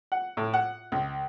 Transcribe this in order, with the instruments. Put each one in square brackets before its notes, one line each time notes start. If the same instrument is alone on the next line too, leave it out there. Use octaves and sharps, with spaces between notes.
[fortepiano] F#5
A2
F#5
C#2